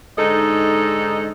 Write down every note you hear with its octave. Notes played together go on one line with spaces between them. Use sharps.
G#2 D3 D#4 A4 D#5